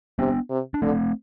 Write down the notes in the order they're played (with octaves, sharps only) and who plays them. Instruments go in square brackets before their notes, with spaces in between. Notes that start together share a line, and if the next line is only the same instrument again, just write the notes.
[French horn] C3 [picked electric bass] B3 D4
[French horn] C3
[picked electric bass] D4
[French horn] D3 [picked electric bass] A3 C4